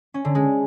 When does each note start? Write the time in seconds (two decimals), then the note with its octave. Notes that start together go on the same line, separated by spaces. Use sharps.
0.14 C#4
0.25 D3
0.35 G#3